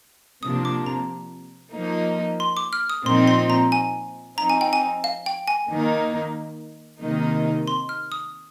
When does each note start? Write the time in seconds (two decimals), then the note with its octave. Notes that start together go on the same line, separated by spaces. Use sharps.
0.43 C3 F3 A#3 D4 D#6
0.65 D6
0.86 A#5
1.74 F3 A#3 D#4
2.40 C6
2.57 D6
2.73 F6
2.90 D#6
3.06 A#2 F3 C4 D#4 C6
3.28 C6
3.50 A#5
3.72 G#5
4.38 F3 C4 D#4 A#5
4.50 G#5
4.61 G5
4.73 G#5
5.04 F5
5.26 G5
5.48 G#5
5.70 D#3 A#3 D#4
7.01 C3 D#3 A#3 D#4
7.68 C6
7.89 F6
8.12 D#6